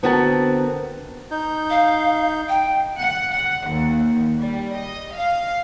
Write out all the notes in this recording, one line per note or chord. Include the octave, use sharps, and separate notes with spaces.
D3 B3 C4 F#4 A#4 A5
D#4 G6
F5
G5
F#5
F#5
D#2
G3
D#5
F5